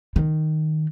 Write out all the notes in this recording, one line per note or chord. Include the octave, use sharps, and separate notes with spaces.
D#3